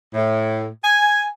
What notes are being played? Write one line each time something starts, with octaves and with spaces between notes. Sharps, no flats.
A2
G#5